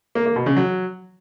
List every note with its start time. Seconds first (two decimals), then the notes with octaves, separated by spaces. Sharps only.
0.15 A#3
0.26 A#3
0.36 B2
0.46 C#3
0.56 F#3